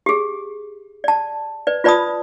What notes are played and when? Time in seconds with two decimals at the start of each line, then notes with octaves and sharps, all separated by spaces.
0.06 G4 G#4
1.04 D5 A5
1.67 B4 D5
1.84 F4 B4 D5 A5 B5 D#6